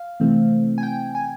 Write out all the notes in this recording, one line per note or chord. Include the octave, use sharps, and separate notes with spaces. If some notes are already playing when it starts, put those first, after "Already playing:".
Already playing: F5
C3 E3 A3 C4
G#5
G5
G#5